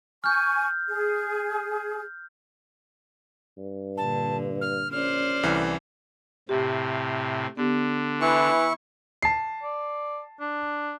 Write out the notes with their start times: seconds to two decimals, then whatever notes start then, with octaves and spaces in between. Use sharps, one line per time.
0.24 G#5 C#6 F6 G6
0.89 G#4
3.58 G2
3.97 A#2 D3 A5
4.61 F6
4.92 A#1 C#4 C5 D5 F6
5.43 C2 A2 E3
6.49 A2 C3 G4
7.57 D3 B3 G4
8.21 E3 E4 C#6
9.22 A5 C7
9.63 D5
10.40 D4